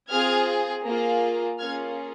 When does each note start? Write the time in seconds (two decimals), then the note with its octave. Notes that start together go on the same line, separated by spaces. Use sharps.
0.10 C4 F4 G#4 F6 G#6
0.84 A#3 F4 G#4
1.58 A#3 C#4 F4 G#4 F6 G#6